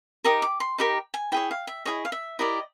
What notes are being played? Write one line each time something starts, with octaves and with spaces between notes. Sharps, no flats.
D#4 G4 A#4 D#6
D6
C6
D#4 G4 A#4 B5
G#5
E4 G#4 C#5 G5
F5
E5
E4 G#4 C#5 D#5
F5
E5
E4 G4 A#4 D5 D#5